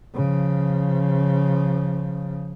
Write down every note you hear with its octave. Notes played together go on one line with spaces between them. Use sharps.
C#3 F3